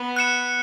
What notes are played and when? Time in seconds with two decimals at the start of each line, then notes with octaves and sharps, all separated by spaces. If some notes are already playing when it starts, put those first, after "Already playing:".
Already playing: B3
0.16 F#6 C#7 E7